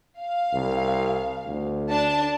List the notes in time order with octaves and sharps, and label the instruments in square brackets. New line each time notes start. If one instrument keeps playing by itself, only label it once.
[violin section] F5
[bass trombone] C2
D2
[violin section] D4 A5